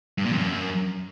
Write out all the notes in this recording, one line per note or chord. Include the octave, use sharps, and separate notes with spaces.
G2
A#2
F2
F#2